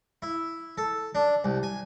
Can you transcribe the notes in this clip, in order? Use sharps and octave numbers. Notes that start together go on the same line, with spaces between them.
E4
A4
D4
C2
G#5